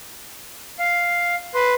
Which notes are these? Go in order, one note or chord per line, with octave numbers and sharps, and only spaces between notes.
F5
B4 C6